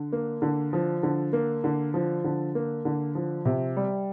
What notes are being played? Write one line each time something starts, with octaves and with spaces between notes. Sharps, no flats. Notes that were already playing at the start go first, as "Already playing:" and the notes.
Already playing: D3
A#3
D3
F3
D3
A#3
D3
F3
D3
A#3
D3
F3
C3
G3